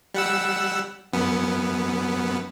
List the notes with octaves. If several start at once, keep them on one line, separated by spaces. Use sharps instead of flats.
G3 F#5 E6
F#2 B3